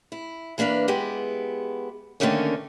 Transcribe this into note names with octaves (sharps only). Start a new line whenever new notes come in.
E4
E3 A#3 D4 B4 F5
G#3 B3 E4 G4
D3 D#3 F#3 A3 A#3 C#4